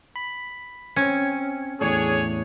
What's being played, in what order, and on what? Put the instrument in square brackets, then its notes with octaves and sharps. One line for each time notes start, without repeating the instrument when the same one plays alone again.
[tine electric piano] B5
[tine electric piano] C4 G#6 C#7 [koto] C#4
[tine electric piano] E2 A2 [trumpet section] D4 G#4 C#5